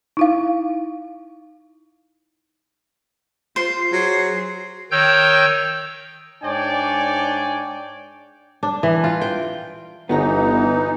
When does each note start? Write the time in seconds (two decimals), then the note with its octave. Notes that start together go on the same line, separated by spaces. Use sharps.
0.17 D#4 E4 F5
3.56 F4 C5 C7
3.93 F#3 G#4
4.91 D#3 C#5 G5 E6 G6
6.43 G#2 D4 C#5 D5 G5 G#5
8.63 D4
8.83 E3
9.04 F4
9.21 G5
10.09 G1 E3 B3 D#4 F#4 A#5